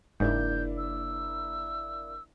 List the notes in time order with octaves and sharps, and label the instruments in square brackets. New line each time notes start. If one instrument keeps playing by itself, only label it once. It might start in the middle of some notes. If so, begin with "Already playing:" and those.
[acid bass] F#1 [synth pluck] G#2 [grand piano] A#3 D4 E4 [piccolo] G6
[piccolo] E6